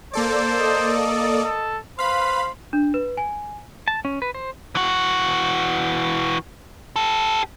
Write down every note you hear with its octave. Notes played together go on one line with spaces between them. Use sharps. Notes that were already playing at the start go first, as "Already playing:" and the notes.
A#3 A4 C5 D5
D#5
A4
B4 C5 F5 B5
D4
B4
G#5
A5
C#4
B4
C5
E3 F#4
G4 A4